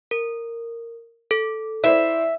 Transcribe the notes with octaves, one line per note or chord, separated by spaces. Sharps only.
A#4
A4
E4 C5 D5 E5